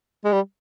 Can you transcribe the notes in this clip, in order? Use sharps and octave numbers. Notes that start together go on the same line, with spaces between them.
G#3
G3